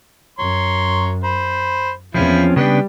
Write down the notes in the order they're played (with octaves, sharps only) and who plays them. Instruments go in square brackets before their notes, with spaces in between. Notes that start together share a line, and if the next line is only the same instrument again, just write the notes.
[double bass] F#2 [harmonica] C#5 A#5 C6
[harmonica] C5 B5
[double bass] E2 [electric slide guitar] F3 C4 C#4 [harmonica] E4 F4
[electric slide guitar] C#3 B3 D4 [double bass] G3 [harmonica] B4 G5